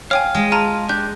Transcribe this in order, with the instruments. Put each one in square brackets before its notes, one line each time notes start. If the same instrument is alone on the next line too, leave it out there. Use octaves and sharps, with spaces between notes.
[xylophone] C#5 G5 G#5 [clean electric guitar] F5
[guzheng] G#3
[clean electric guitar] F4 [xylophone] A5 A#5 D#7
[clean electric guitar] D4 G4 [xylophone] G6